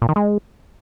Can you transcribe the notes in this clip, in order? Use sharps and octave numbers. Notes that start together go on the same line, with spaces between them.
A#2
D#3
G#3